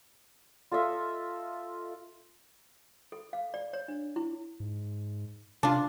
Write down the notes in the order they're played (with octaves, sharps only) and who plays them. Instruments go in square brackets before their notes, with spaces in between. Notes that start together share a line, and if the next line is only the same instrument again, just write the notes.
[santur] F4 A4 D#5 E5
[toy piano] A4
F5
D5
C#5
D4
E4
[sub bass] G#2
[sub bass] C3 [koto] D4 F4